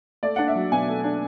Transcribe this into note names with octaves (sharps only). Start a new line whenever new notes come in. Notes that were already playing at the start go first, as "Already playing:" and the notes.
A3 D5
D4 F#5
E5
F#3
B2 G#5
A3
D4